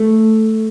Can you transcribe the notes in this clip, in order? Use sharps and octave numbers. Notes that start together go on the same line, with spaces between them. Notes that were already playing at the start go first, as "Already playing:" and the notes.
Already playing: A3